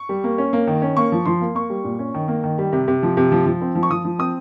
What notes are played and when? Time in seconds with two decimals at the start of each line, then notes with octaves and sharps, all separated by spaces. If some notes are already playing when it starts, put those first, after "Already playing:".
Already playing: C#6
0.09 G3
0.24 A#3
0.38 C#4
0.53 A#3
0.67 D#3
0.82 C#4
0.97 A#3 C#6
1.12 F3
1.26 F3 C6
1.41 A#3
1.55 A#3 C#6
1.70 G3
1.84 A#2
1.99 C#4
2.14 D#3
2.28 A#3
2.44 D#3
2.58 G3
2.73 C3
2.88 C3
3.03 F3
3.17 C3
3.32 F3
3.46 F3
3.61 C4
3.75 F3
3.83 C#6
3.90 F3 D#6
4.04 F3
4.19 C4 D#6